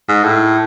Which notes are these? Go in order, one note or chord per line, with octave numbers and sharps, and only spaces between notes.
G#2
A2